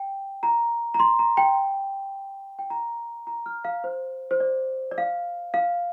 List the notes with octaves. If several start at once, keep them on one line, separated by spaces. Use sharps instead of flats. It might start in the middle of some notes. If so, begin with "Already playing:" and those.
Already playing: G5
A#5
A#5
C6
A#5
G5
G5
A#5
A#5
F6
F5
C5
C5
D5
D5
F5
F5